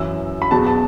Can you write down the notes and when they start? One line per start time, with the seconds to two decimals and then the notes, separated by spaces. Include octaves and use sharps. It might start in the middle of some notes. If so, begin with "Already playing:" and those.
Already playing: F#2 E3 E6
0.42 B5
0.51 E2 B2 F#3 A5
0.67 A5